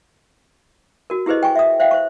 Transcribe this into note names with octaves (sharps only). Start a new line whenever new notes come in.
F#4 A#4
E4 G4 G#4 B4 C5 D#5
G5 G#5 C#6
E5 D#6
C5 E5 F5 G5
C5 C#6